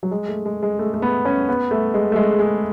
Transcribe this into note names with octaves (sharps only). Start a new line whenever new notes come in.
F#3
G#3
A3
G#3
G#3
A3
A3
B3
C#4
B3
A3
G#3
A3
G#3
G#3